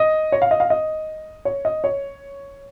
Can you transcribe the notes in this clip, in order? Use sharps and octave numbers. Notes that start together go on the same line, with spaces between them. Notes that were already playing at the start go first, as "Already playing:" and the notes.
Already playing: D#5
C#5
F5
D#5
F5
D#5
C#5
D#5
C#5